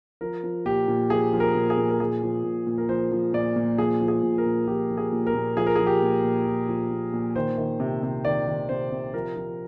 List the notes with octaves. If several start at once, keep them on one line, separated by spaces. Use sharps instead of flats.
F3 A#4
F3
A#2 G4
A#2
F3 G#4
F3
A#4
A#2
G#4
A#2
A#4
F3 G#4
F3
A#2
A#2
A#4
F3 C5
F3
A#2 D5
A#2
F3 G#4
F3
G#4
A#2
A#4
A#2
F3 G4
F3
G#4
A#2
A#4
A#2
F3 G#4
A#4
F3 G#4
G4
A#2
A#2
F3
F3
A#2
A#2
D#3 C5
D#3
C3
C3
D#3 D5
D#3
C3 C5
C3
F3 A#4
F3